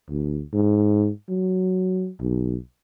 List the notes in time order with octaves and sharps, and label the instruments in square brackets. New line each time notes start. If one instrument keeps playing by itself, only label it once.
[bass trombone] D2
G#2
F#3
B1